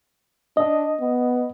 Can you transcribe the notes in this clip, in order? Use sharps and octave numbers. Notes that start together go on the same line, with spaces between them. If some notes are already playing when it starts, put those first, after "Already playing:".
D4 D#5
B3